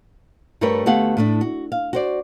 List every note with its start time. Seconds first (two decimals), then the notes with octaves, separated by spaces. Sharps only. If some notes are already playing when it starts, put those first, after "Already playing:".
0.61 G2 G3 A3 A#4 B4 C#5
0.86 D2 A3 B3 G4 F5 F#5
1.17 A2 A3 D4
1.41 F#4
1.72 F5
1.93 F#4 C5 D5